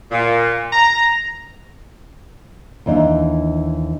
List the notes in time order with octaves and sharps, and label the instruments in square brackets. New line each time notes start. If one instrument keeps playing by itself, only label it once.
[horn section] A#2
A#5
[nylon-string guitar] D#2 E3 D4 D#4